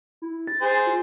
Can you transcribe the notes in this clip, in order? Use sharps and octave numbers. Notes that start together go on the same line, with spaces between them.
E4
A6
G#4 C5
F4